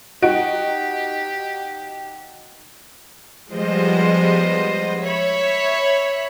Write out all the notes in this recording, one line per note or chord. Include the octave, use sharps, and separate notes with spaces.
D#4 F#4 G4 D7
F3 G3 G#3 B3 C5 D#5
C#5 E5 B5